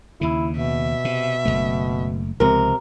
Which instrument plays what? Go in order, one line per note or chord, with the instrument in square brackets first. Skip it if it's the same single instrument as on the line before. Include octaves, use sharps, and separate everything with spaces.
[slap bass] D#2 C#3 [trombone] E4
[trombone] B2 [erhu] E5
[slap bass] C3
F#1 E2 A3
[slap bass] C#2 F3 G#3 [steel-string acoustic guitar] C3 A#4